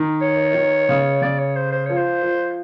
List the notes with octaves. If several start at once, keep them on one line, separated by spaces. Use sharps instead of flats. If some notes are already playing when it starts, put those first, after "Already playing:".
Already playing: D#3
C#5
D#3
C#3
C#3 D5
C#5
C5
C5
F3 C#5
C5
F3